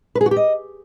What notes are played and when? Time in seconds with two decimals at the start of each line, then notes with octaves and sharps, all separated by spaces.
0.15 B4
0.21 G#4
0.26 F#4
0.31 G4
0.36 D#5